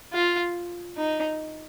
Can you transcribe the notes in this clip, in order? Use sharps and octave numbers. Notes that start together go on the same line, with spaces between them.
F4
D#4